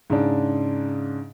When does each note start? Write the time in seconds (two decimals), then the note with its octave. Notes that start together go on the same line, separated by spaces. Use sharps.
0.10 G#2 C#3 D4